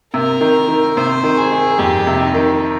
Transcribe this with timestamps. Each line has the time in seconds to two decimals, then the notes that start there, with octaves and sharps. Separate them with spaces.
0.14 C3 A#4
0.41 D#3
0.68 D#3
0.97 C3 C5
1.24 D#3
1.38 G#4
1.51 D#3
1.79 F2 G4
2.07 C3
2.21 D#4
2.34 D#3